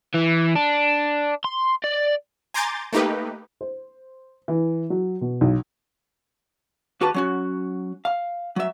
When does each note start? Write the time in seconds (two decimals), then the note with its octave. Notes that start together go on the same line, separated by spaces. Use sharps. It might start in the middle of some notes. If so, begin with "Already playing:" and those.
0.14 E3
0.55 D4
1.44 C6
1.84 D5
2.54 G#5 A#5 C6 D6 G6 A6
2.93 A3 A#3 D#4 G4 B4
3.61 C5
4.48 E3
4.90 F#3
5.21 B2
5.41 B1
7.01 D#2 F#4 G4 B4 A5
7.14 F#3 C#4 F#4
8.05 F5
8.56 F#3 E5